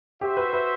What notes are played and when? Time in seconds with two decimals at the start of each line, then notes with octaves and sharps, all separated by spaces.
0.21 F#4 G4 C5 E5
0.37 B4
0.53 B4